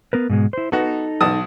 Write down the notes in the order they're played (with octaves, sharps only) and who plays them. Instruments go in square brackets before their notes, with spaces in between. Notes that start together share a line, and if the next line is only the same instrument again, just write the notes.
[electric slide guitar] B3 A#4 B4
G#2 B2 G#3
E4 C5
[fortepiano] B3 F#4 [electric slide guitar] D#4 A4
[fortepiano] B1 A5 D#6